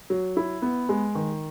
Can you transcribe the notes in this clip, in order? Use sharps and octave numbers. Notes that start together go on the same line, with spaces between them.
F#3
E4
B3
G#3
D#3